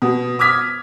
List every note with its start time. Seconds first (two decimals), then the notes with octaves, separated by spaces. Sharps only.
0.02 B2
0.39 D6 D#6 F6 G#6 B6